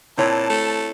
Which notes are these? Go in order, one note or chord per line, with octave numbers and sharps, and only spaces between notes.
A#2 C4 E4 C#5 A5
A3